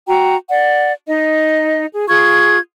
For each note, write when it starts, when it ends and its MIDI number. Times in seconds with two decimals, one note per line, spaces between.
0.08 0.36 66
0.08 0.36 79
0.08 0.36 82
0.50 0.92 74
0.50 0.92 78
1.08 1.84 63
1.08 1.84 75
1.92 2.08 68
2.09 2.58 65
2.09 2.58 68
2.09 2.58 85
2.09 2.58 92